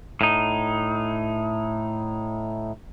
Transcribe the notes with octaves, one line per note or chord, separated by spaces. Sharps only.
A2 D#4